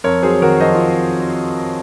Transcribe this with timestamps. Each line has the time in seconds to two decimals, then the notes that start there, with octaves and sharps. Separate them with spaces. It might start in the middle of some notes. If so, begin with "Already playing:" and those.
0.04 F2 A#4 C#5
0.23 F#3 G#4 C5
0.41 D#3 F#4 A#4
0.60 F2 C5 D#5
0.75 F4